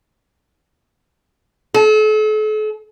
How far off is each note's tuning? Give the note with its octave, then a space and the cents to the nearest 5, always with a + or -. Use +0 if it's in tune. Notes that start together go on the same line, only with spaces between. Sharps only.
A4 -40